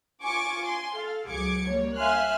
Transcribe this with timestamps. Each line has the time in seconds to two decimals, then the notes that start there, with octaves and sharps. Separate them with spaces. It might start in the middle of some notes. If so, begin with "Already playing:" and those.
0.23 F4 G#5 C#6 D6
0.64 G#5 C6
0.94 A4 F5
1.27 C#2 F#3 G#4 D6 G#6 C#7
1.69 G3 A#3 C#5
1.97 E5 F5 G#5 C6 F6 F#6